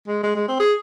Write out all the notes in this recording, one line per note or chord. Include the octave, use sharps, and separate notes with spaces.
G#3
G#3
G#3
C4
G#4